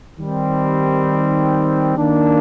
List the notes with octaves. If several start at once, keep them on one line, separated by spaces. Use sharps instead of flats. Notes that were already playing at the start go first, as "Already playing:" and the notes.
D#3 G3 C4
D#3 A#3 D4